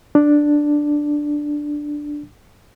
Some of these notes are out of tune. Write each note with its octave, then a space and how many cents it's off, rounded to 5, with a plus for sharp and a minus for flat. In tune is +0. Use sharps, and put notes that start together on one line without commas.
D4 +5